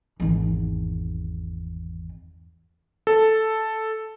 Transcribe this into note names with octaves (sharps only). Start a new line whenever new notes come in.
G#1 E2
A4